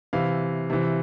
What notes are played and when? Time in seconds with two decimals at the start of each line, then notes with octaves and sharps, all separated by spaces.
0.13 C3 E3 F5
0.70 C3 E3